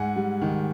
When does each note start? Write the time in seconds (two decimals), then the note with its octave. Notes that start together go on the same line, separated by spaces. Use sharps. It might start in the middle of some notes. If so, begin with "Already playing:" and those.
Already playing: G#2 F#5 G#5
0.16 G3
0.41 D#3